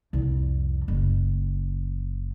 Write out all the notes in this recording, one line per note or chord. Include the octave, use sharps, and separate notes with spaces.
C2 F2
F#1